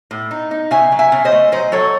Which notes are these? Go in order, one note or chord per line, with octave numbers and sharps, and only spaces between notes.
A2
D#4
D#4
C#3 E5 G#5
F#3
E5 G#5
C#3
C5 D#5
A3
F#3 C5 D#5
F#3 A4 C#5